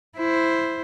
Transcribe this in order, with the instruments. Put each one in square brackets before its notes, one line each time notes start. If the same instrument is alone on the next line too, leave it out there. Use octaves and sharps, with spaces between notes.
[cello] E4 C5